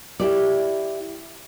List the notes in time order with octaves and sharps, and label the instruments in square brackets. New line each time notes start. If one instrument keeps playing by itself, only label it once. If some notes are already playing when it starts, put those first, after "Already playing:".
[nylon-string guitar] E4 G4 D5